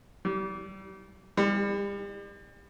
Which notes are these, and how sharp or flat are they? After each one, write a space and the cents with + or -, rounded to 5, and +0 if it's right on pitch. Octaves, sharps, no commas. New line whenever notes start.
G3 -30
G3 +35